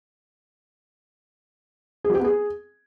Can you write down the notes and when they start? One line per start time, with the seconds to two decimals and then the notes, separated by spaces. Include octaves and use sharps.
2.04 G#4
2.09 F#3
2.14 G4
2.19 B3
2.24 G#4